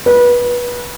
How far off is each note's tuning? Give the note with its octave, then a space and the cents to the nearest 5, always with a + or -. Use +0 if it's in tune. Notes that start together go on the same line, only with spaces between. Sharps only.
B4 -25